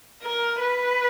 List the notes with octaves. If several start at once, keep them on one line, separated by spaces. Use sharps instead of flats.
A#4
B4